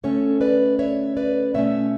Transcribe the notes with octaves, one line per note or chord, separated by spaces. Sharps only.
D3 A3 C#4 A4 C#5
B4 D5
C#5 E5
B4 D5
B2 A3 C#4 C#5 E5